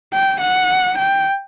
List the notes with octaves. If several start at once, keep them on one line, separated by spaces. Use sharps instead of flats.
G5
F#5
G5